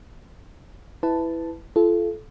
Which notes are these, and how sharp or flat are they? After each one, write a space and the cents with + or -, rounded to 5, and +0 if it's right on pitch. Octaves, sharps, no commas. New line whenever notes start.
E4 +0 B4 +15 A5 +0
F4 -30 A4 -25